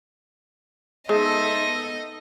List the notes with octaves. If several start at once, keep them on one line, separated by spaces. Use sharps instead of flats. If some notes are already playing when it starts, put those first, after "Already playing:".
G#3 B3 D#4 A4 C5 D#5 E5 A5